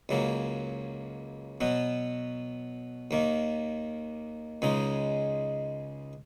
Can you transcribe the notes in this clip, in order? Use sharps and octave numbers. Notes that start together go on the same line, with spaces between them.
C#2 C#3 F#3 A#3
B2 F#3 B3
D#2 D#3 A#3
C#2 C#3 G#3 D#4